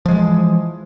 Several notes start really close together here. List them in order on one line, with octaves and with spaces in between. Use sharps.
F3 G#3 E3